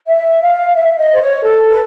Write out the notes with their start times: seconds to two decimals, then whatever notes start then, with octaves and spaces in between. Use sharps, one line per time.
0.08 E5
0.42 F5
0.76 E5
0.98 D#5
1.13 C5
1.21 C#5
1.43 A4
1.70 B4